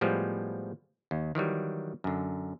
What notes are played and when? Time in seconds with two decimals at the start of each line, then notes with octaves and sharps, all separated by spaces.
0.01 A2 F3 G3 G#3 B3
1.11 D#2
1.35 D#3 E3 F#3 G3
2.04 F#2 D3